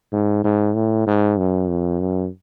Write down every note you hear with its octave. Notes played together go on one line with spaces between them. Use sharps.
G#2
G#2
A2
G#2
F#2
F2
F#2